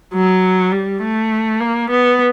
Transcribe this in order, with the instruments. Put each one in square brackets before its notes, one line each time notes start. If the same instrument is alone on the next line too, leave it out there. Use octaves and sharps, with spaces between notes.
[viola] F#3
G3
A3
A#3
B3